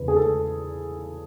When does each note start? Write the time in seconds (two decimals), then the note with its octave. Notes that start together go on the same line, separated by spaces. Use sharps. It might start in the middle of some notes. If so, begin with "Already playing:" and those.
Already playing: E2 C#3 E3 B4
0.08 G#4
0.16 A4